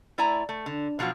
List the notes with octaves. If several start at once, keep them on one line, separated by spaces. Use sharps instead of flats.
A3 E4 D5 G#5 A#5
A3
D3
B2 F3 F#3 F4 F#4